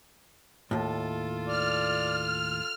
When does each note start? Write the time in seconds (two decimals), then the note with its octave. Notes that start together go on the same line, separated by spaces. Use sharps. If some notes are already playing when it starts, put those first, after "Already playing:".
0.71 D#2 A2 F4 A4
1.48 D5 F6